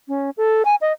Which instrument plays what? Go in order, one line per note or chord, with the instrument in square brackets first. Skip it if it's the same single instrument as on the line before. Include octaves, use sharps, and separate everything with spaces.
[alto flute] C#4
A4
G#5
D#5